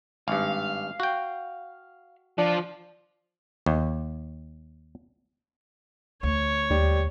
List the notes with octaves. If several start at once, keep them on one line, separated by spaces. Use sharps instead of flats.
G#1 G2 F5
F#4 G5
F3 D4 F4
D#2
D2 C#5
D#2 G3